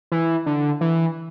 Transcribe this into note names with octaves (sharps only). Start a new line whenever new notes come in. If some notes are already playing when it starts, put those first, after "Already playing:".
E3
D3
E3